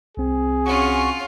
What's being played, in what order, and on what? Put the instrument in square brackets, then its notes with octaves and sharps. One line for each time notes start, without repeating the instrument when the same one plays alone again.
[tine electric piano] C2 C4 [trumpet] G#4
[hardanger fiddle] C#4 F4 [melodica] F#4 C#6